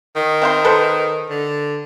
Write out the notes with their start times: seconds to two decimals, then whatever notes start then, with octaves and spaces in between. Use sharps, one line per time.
0.16 D#3
0.42 C4 F5 C6
0.65 A4 B4 C5
1.30 D3